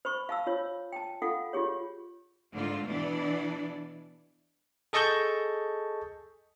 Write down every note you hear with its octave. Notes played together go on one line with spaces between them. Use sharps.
C5 B5 C#6
F5 A5 E6
F4 C#5
G5 A5
F4 A4 F5 F#5
F4 G4 G#4 C#5
G#2 D3 A3 A#3 F4
B2 E3 B3 D4 D5
G#4 A4 D#5 A5 C#6 G6